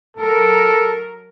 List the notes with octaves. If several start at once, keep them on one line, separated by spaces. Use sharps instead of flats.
F#3 A4 A#4